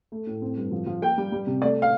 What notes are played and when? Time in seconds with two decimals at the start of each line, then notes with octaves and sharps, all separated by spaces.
0.12 A3
0.27 A2
0.42 C4
0.57 G2
0.72 F3
0.86 F3
1.02 A#3 G5
1.18 G3
1.32 G3
1.47 C3
1.62 A3 D5
1.82 F5